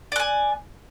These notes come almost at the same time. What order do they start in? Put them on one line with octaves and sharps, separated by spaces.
D5 F#6 G#5